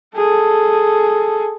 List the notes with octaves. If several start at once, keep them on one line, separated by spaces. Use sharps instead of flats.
G#4 A4